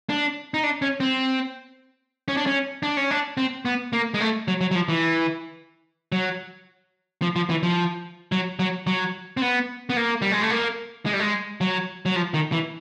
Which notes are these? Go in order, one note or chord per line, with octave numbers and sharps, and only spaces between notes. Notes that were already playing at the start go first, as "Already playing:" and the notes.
D4
D#4
D4
C#4
C4
C#4
D4
C#4
D4
C#4
D4
C4
B3
A#3
G#3
A3
F#3
F#3
F#3
F3
E3
F#3
F3
F3
E3
F3
F#3
F#3
F#3
C4
B3
B3
A#3
G3
G#3
A3
A#3
G#3
G3
G#3
F#3
F#3
F3
D#3
E3